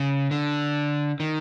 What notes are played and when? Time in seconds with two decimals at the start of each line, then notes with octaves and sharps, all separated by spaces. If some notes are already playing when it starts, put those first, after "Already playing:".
Already playing: C#3
0.31 D3
1.20 D#3